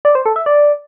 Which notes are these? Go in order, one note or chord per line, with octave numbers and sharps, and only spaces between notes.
D5
C5
A4
E5
D5